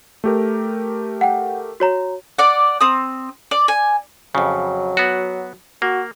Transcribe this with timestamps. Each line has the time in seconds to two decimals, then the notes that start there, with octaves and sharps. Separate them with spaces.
0.24 A3 G4 A#4
1.21 F#5 G5
1.80 F#4 C#5 A#5
2.38 D5 F#5
2.81 C4 D#6
3.51 D5
3.68 G#5
4.35 F2 C#3 F#3
4.97 B3 F#4
5.82 A#3 F#4